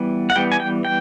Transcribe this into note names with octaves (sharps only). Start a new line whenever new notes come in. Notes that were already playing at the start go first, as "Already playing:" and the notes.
Already playing: E3 G3 B3
F#5
E3 G3 B3 G5
G#5
G5
G5